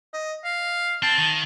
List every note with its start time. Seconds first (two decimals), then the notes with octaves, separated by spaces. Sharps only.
0.14 D#5
0.44 F5
1.03 C4 A5
1.18 D#3